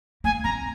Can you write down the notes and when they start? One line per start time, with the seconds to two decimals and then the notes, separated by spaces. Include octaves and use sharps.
0.24 A#3 G#5
0.44 C4 A#5